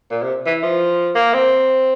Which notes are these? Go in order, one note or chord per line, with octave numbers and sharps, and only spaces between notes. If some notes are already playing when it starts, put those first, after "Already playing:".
A#2
C3
E3
F3
A#3
C4